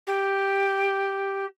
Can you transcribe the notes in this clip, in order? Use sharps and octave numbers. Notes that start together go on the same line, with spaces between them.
G4